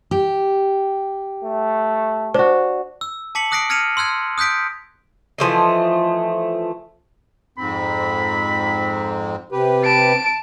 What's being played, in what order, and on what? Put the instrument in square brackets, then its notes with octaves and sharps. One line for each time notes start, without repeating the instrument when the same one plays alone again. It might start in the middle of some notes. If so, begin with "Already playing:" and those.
[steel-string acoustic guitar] G4
[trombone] A3
[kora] D4 F#4 [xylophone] C5
[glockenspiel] E6
A5 D6 B6 C#7 F#7
D6 D#6 F#6 A#6 C7 D7
F6 G#6 A#6 C#7 D#7 F7
C6 E6 F#6 G#6
D#6 F#6 G6 B6 D7
[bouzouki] E3 F3 A3 D#5
[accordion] F2 G#2 C4 [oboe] B5
[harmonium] C3 G4 B4
[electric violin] A5 D7